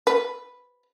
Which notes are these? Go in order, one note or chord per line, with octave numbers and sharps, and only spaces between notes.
B4